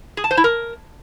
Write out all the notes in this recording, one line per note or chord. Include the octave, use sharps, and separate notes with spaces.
G#4
A5
C5
E4
A#4